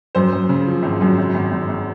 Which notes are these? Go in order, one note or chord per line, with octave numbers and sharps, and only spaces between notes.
F#2 C5
F#2
C#3
F3
G#1
F#2
G#1
G#1
G#1
G#1